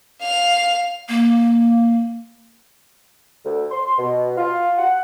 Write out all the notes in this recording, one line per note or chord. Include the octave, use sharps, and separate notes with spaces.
F5 F7
A#3
D2
C6
B2
F4
F#5